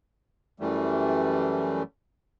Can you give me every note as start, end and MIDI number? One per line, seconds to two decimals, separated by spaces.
0.60 1.83 42
0.60 1.83 52
0.60 1.83 55
0.60 1.83 57